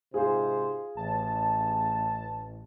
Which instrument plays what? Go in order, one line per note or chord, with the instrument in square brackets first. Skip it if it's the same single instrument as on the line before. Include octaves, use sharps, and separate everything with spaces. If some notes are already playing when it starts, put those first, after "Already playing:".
[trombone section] G#2 C3 C5 [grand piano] F4 G#4
[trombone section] A1 [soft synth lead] A5